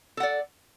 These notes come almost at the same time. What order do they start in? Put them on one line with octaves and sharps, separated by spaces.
A4 F#5 D5